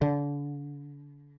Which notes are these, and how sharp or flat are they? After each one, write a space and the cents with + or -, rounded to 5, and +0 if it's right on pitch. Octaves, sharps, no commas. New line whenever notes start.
D3 -35